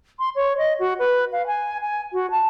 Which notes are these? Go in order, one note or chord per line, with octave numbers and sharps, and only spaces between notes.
C6
C#5
D#5
F#4
B4
F5
G#5
G#5
F#4
A5